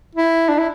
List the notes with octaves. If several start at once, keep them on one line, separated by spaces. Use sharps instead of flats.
E4
D4
E4